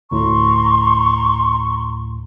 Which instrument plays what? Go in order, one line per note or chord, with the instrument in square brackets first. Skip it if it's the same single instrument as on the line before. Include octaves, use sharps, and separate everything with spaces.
[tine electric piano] D2 A2 [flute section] A#5 C6 C#6